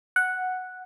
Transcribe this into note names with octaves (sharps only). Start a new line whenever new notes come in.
F#5